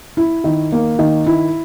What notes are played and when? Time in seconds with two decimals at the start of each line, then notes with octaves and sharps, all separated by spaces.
0.17 E4
0.44 D#3
0.72 A#3
0.99 D#3
1.26 E4